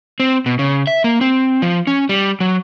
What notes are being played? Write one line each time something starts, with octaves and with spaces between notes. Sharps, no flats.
C4
B2
C#3
E5
A#3
C4
F3
C#4
G3
F#3